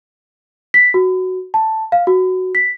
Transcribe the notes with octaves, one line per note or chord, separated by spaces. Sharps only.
B6
F#4
A5
F5
F#4
B6